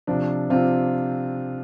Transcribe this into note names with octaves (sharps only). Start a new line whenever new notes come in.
C3 F3 D4
C3 F3 C4 F4